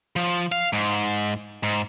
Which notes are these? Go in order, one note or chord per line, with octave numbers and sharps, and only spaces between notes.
F3
F5
G#2
G#2